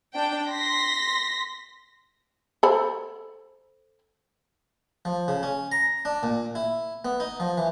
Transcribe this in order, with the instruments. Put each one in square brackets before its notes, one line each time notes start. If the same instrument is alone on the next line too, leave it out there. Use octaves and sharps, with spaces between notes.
[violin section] D4 G5
C6 A#6 B6
[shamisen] A4 C5 B5
[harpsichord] F3
C#3
C#4
A#5
D4
A#2
E4
B3
D#4
F3
E3